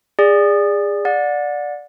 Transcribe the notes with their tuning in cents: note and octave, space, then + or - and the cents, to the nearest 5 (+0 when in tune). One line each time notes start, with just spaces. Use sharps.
G#4 -25 D5 +0
D5 +0 F#5 -35